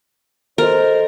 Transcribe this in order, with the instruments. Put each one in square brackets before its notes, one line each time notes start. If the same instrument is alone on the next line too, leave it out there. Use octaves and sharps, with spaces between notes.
[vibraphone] A4 D#5 [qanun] A#4 [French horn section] C5